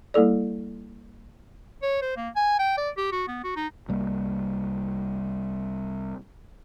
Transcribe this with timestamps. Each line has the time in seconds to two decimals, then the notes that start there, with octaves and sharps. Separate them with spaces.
0.14 G3 A#3 E4 A4 D5
1.82 C#5
2.02 C5
2.17 A#3
2.36 G#5
2.59 G5
2.77 D5
2.97 G4
3.12 F#4
3.28 B3
3.44 F#4
3.56 D#4
3.89 C2 G3 A#3